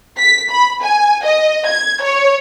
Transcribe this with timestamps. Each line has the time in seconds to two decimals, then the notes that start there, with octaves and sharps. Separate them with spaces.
0.17 B6
0.51 B5
0.82 G#5
1.23 D#5
1.67 G#6
2.02 C#5